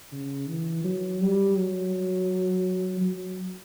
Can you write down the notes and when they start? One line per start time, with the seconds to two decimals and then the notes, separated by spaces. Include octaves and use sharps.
0.12 C#3
0.48 E3
0.84 F#3
1.21 G3
1.57 F#3
3.01 F#3